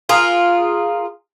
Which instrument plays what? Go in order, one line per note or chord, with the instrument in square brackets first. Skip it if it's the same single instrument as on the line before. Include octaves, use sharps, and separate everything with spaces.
[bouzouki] F4 G#4 A#4